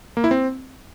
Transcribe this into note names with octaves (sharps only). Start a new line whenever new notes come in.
A#3
E4
C4